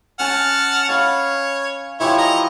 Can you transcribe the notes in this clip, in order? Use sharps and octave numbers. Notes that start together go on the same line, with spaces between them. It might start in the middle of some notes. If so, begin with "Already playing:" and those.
C#4 F#5 G#5 A5 F6
C#5 F5 B5
E3 F3 E4 G4 C#5
D#5 A#5